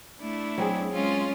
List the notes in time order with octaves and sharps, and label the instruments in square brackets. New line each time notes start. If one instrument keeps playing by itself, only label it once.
[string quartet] A3 D4 E4
[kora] F#3 C4 G#4
[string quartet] G#3 C#4 F4